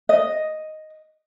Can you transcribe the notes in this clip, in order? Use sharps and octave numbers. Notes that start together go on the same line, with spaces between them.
D#5